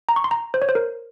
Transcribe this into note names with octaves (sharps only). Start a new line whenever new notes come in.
A#5
C#6
C6
A#5
C5
C#5
C5
A#4